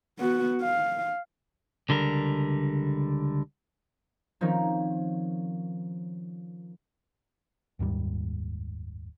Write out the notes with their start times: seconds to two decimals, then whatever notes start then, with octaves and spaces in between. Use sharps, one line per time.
0.19 B3 F#4
0.62 F5
1.89 C#2 D3 G3 A#4
4.41 D#3 F3 C4 C#4 D#4 A#4
7.79 F#1 D#2 G#2 G3